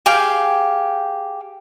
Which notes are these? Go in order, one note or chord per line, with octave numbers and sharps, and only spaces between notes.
G4 G#4 F5 G5